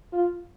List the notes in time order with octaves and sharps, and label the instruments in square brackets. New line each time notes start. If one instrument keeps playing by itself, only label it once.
[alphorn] F4